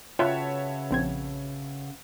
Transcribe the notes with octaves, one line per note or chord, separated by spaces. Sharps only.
C#3 F4 F#4 B4 C#5 E5 G5 A5
A#1 C4 G#6